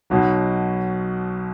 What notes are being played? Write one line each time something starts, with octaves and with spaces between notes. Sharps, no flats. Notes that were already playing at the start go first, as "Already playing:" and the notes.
B1 B2 F#3